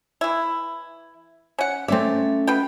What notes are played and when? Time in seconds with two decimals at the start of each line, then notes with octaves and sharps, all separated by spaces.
0.21 E3 E4
1.59 C#4 F#5
1.88 A3 C4 C#4 D5 E5
2.47 B2 B4 G5